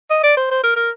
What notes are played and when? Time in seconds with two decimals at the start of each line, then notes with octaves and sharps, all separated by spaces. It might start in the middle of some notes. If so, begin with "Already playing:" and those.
0.11 D#5
0.23 D5
0.37 C5
0.51 C5
0.64 A#4
0.76 A#4